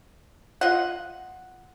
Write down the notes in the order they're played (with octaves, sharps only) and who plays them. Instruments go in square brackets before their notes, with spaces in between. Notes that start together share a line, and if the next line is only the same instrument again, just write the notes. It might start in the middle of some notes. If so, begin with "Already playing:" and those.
[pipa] F4 D#5 F#5